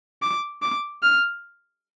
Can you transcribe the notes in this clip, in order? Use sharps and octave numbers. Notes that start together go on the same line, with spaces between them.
D6
D6
F6